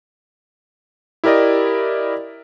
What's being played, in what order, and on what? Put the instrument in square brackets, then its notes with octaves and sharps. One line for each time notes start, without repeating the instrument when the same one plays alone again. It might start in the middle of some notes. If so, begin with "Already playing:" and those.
[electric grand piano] E4 G4 A#4 D5 D#5